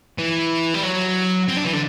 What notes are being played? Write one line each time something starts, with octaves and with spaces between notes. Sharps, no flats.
E3
G3
F#3
C4
D4
E3
D3